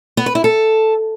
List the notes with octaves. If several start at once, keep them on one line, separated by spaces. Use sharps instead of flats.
B3
B4
E4
A4